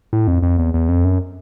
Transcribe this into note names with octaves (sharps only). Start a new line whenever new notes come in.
A2
F2
F2
E2
E2
F2
F#2